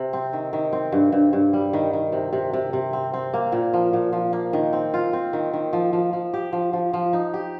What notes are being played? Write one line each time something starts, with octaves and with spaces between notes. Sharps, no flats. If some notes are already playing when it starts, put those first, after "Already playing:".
Already playing: C3
C4
D#3
D#3
C4
G2
G2
G2
G3
D#3
D#3
C3
C3
C3
C3
C4
C4
A#3
A#2
F3
A#2
F3
A#3
D#3
C4
F4
C4
D#3
D#3
F3
F3
F3
G4
F3
F3
F3
D#4
G4